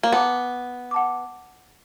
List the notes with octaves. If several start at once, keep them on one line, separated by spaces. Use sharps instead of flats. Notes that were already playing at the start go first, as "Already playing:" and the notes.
A#3
B3 F#5 A5 D6
F#5 A5 D6